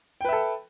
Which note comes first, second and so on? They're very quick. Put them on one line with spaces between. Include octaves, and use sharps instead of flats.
G5 B4 E5 A4